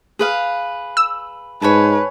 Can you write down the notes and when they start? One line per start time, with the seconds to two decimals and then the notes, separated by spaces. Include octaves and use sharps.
0.19 G#4 B4 F5
0.97 E6
1.62 G#2 B4 C#5 G#5 A5